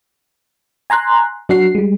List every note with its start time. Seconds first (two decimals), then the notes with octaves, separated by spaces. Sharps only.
0.90 G#5 A#5 C6 F#6
1.49 F#3 D4 F#4 F#5 C7
1.75 G3 G#3